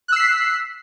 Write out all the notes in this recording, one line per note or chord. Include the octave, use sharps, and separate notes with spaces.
E6 F#6 B6 C7